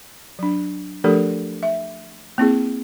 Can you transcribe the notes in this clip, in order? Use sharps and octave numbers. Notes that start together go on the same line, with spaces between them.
F#3 D4
F3 A3 D4 G4 A4 A#4
E5
A#3 C4 E4 G#4